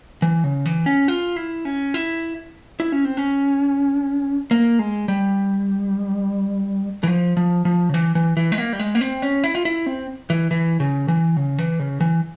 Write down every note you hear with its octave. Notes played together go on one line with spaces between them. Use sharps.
E3
C#3
E3
C#4
F4
E4
C#4
E4
E4
C#4
C4
C#4
A#3
G#3
G3
E3
F3
F3
F3
C#3
E3
E3
E3
G#3
A#3
G3
G#3
A#3
C4
C#4
E4
F4
E4
C4
E3
E3
C#3
E3
C#3
E3
C#3
E3